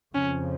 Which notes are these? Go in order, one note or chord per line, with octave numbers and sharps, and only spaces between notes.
F2 C#3 F3 C#4